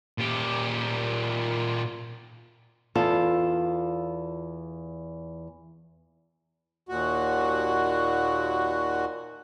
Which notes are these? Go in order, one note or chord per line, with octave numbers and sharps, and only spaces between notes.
A#2 G4
E2 F4 A4
D#2 A#2 F#4